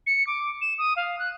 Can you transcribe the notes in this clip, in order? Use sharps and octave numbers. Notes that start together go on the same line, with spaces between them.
C#7
D6
E7
D#6
F5
F#6